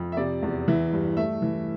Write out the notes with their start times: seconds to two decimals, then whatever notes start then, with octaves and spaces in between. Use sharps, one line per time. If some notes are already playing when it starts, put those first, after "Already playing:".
Already playing: F2
0.12 E5
0.17 C3 D5
0.43 E2
0.68 E3 E5
0.92 G2
1.17 A3 E5
1.42 E3